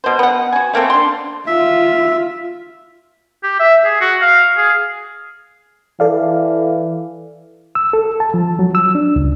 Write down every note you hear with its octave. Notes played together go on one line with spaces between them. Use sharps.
B2 C5
B3 F#5
F#4 G#5
A3 A#3 C4 A4
D4 C6
F4 E5
G4
E5
G#4
F#4
F5
G#4
E3 A4 D5 F5
E6
A4
A5
F3
F#3
E6
D4
C#2